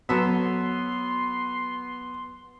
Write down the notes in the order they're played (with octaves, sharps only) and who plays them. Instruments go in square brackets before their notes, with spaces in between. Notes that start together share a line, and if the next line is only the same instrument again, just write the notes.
[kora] F#3 A4 E5 [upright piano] B3 [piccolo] C6